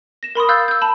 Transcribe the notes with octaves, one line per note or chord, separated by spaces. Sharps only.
A#6 E7
A#4 B5 C6 D#6
F5 E6 F#6 G6 A6
E6 G6
A5 B5